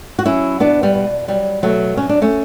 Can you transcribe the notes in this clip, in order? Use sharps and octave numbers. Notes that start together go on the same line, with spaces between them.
F#4
F#3 C#4 E4
B2 B3 D4
G3 B3
B2
F#3 G3
B2 F#3 A3
F#3 C#4
D4
A3 C#4